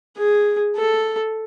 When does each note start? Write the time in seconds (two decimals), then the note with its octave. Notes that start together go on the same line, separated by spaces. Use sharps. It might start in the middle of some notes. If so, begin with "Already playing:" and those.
0.18 G#4
0.77 A4